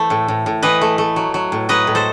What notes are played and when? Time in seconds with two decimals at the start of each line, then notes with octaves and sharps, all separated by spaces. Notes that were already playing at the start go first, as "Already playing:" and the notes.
Already playing: E3 A3 A4 C5
0.10 A2
0.28 A2
0.46 A2
0.63 E3 B4 D#5
0.81 A3
0.98 A3
1.16 F#3
1.34 F#3
1.52 A2
1.69 F#3 B4 D#5
1.87 A2
1.95 A4 C5